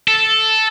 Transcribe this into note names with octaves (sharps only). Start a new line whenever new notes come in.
A4